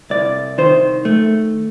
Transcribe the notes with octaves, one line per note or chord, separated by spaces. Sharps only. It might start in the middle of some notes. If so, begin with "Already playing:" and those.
C2 D5
D#3 C5
A3